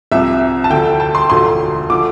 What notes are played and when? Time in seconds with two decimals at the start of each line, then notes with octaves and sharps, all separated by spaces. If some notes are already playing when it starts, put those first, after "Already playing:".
0.12 C2 C3 F3 E5
0.64 A5
0.70 D2 D3 F3 G5
1.00 A5
1.15 C6
1.30 E1 D2 D3 F3 C6
1.90 D3 F3 D6